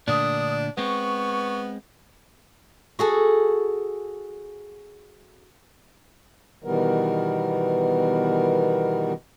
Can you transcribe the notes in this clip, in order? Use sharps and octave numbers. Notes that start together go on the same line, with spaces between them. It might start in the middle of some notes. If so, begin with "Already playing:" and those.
A#2 D3 A3 D4 D#6
G#3 B3 C4 C#6
F#4 G#4 A4
B2 D#3 E3 G3 B3 A#4